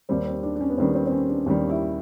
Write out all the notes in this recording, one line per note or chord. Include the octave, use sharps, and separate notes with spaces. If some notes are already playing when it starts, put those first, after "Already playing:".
D#2 D#3 G3 C4
C4
D4
D4
C#4
B3
D#2 D#3 G3 C4
C4
C4
C#4
D4
D#2 D#3 G3
E4